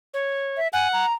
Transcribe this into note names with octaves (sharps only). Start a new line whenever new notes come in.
C#5
E5
F#5 G#5
A#5